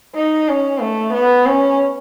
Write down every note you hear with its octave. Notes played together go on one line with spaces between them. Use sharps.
D#4
C#4
A3
B3
C#4